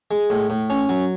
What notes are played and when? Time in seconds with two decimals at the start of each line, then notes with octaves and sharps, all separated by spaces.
0.11 G#3
0.30 A2
0.50 A2
0.70 C#4
0.89 F#3